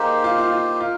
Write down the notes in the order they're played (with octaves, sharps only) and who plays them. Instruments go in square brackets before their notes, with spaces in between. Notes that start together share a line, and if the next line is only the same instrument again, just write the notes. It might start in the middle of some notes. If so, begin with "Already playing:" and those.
Already playing: [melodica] A#3 D#4 G4 C5 [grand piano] G#4 A#4
[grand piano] F4
F4
F4
[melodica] D#4 A#4 [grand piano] F4